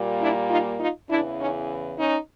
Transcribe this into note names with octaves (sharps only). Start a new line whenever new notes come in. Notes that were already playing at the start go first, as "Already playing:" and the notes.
Already playing: A#2 G3 A#3
D4 E4
D#4 F4
D#4 F4
E2 C#3 E3 D4 E4
C#4 D#4
C#4 D#4